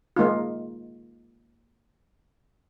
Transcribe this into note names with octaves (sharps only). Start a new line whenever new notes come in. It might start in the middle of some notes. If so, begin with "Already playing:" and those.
G#3 A#3 D#4 F4